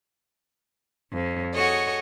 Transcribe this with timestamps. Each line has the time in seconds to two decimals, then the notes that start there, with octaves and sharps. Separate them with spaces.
1.12 F2
1.53 F#4 G#4 A4 C#5 D#5